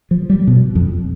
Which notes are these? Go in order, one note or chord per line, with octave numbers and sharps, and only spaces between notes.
F3
G3
B2
F2